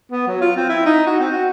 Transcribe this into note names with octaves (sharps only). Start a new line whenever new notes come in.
B3
F#3
F4
C4
E4
D#4
F#4
C4
F#4